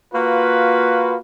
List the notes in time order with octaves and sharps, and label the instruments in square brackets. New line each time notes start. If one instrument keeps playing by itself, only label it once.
[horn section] A#3 F4 F#4 B4